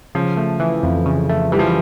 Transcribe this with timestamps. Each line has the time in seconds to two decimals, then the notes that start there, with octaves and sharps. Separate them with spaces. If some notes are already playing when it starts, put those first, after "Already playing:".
0.15 C#3 F3
0.37 A3
0.60 E3
0.83 F2
1.06 C#3
1.29 A3
1.52 E3 G3
1.59 F3